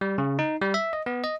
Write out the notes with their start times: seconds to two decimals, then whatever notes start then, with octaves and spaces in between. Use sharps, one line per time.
0.01 G3
0.18 C#3
0.39 D#4
0.61 G3
0.74 E5
0.93 D#5
1.06 B3
1.24 D#5